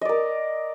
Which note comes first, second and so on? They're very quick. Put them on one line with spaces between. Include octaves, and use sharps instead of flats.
D#5 D5 A#4